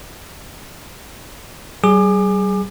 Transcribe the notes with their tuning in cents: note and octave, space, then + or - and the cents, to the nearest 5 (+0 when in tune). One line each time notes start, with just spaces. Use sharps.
G3 -35 G#4 +0 D6 +30